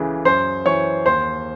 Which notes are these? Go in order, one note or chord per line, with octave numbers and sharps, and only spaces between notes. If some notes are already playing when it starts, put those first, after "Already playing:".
Already playing: C#2 C#3 E3 A4
F#2 C5 C6
E3 C#5 C#6
D#2 C5 C6